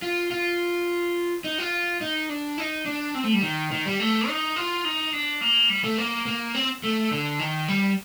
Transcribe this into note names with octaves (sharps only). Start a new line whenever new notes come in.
F4
F4
D#4
F4
D#4
D4
D#4
D4
C4
A3
G3
D#3
D#3
G3
A3
D#4
F4
D#4
D4
A#3
G3
A3
A#3
A#3
C4
A3
D3
D#3
G3